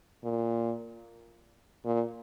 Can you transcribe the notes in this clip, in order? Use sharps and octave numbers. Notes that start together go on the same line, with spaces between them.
A#2
A#2